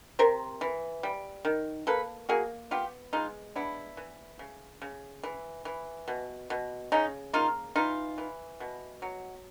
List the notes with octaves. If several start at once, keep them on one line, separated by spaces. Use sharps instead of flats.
C3 A#4 C5
E3
G3
D#3
A#3 A4 B4
A#3 F#4 G#4
B3 F4 G4
G#3 D#4 F4
B3 D4 E4
E3
C#3
C#3
E3
E3
B2
B2
C#3 C#4 D#4
A#3 D#4 F4
E3 D#4 F4
E3
B2
F#3